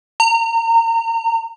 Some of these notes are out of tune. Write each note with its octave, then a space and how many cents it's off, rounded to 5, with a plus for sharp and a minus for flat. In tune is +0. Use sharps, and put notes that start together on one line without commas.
A#5 -30